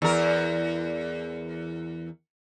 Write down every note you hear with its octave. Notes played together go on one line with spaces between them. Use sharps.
E2 A#4